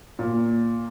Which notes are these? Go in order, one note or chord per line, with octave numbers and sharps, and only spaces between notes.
A#2